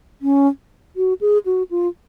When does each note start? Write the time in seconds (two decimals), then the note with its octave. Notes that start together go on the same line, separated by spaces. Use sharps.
0.22 C#4
0.96 F#4
1.21 G#4
1.46 F#4
1.71 F4